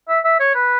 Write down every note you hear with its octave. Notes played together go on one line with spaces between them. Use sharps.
E5
E5
C#5
B4